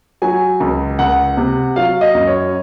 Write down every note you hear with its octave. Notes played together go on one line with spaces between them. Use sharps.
F#3 G#5
C#2
C#2 F#5
C3
F#3 F5
D#5
F#2
C#5